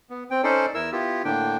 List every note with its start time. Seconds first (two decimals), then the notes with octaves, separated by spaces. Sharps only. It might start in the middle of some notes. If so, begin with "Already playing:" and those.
0.10 B3
0.30 C4 G5
0.43 C#4 D#4 A4 C5 D5
0.74 E2 E4 A#4 E6
0.92 B3 E4 F4 G4
1.25 A2 D3 A#3 D4 G5